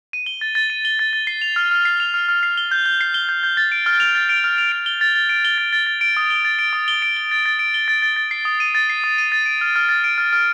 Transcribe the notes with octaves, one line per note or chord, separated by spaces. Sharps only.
D#7
G7
A6
A6
D#7
G7
A6
A6
C7
F7
F6
F6
C7
F7
F6
F6
C7
G7
G6
G6
C7
G7
G6
G6
A6
D7
F6
F7
A6
D7
F6
F7
D7
G7
A6
A6
D7
G7
A6
A6
A6
D7
D#6
G7
A6
D7
D#6
G7
D7
G7
A6
A6
D7
G7
A6
A6
A6
C7
D#6
D#7
A6
C7
D#6
D#7
A6
D7
F6
F6
A6
D7
F6
F6